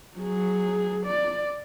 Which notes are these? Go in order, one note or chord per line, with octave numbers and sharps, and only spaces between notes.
F#3 G#4
D5